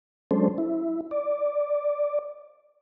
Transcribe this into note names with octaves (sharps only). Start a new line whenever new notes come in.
F#3 G#3 C#4 D4 A4 C5
E4
D5